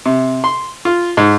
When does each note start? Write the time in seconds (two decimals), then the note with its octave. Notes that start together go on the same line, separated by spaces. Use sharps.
0.06 C3
0.44 C6
0.85 F4
1.17 G#2